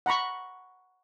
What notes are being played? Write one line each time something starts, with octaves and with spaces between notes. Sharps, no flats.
F#5 A#5 B5 C#6